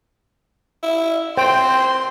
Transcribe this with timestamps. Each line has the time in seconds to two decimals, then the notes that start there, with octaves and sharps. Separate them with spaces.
0.83 E4
1.37 C4 C5 G5 C6